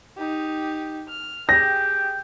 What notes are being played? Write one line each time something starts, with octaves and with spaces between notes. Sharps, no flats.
D#4 G4
F6
G4 G#4 G5 A#6